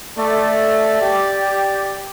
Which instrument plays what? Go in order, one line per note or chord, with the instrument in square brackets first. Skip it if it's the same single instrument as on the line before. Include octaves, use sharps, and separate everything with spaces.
[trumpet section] A3 [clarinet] D5
[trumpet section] G4